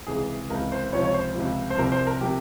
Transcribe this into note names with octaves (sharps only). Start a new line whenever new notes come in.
C#2 C3 E3 G#4
C#2 C3 E3 A#4
C5
C#2 C3 F3 C#5
C#5
C5
C#2 C3 F3
C5
C2 C3 F3 A#4
C5
A#4
C3 F3 G4